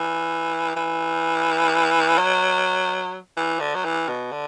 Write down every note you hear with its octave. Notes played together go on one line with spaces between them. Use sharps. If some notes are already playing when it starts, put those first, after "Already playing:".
Already playing: E3
E3
F#3
E3
D3
F#3
E3
B2
D3